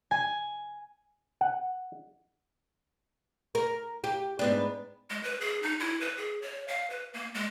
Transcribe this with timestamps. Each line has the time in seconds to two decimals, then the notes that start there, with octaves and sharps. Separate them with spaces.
0.11 G#5
1.41 F#5
3.55 A#4
4.04 G4
4.39 G#2 B3 D4
5.10 G#3
5.23 B4
5.41 G#4
5.63 D#4
5.80 E4
6.01 B4
6.17 G#4
6.42 C#5
6.68 F5
6.90 B4
7.14 A#3
7.35 G#3